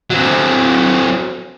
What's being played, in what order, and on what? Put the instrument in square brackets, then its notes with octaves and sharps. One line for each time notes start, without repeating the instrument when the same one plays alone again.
[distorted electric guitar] F#3 C4